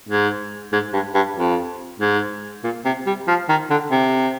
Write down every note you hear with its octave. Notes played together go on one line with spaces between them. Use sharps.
G#2
G#2
G2
G2
F2
G#2
A#2
C3
G3
F3
D#3
D3
C3